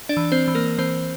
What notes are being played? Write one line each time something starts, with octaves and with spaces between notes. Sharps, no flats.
D4 D5
E3
C4 C5
E3
A#3 A#4
E3 C4 C5